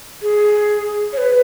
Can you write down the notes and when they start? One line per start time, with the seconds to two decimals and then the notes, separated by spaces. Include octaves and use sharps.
0.22 G#4
1.13 C#5
1.18 B4